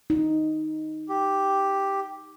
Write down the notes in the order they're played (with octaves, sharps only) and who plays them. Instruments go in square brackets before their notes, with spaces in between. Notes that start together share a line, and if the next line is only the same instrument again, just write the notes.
[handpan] D#4
[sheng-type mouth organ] G4